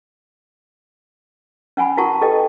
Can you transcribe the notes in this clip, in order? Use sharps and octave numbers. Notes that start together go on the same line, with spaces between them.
C#4 F#5 G#5 B5
E4 F#4 A#4 F#5 A5 C#6
G4 A4 B4 D#5 G5